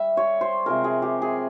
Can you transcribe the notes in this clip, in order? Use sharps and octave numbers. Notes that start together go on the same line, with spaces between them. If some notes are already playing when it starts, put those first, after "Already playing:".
Already playing: G3 E5
C#5
C5
C3 F3 G#3 A#4
G#4
G4
G#4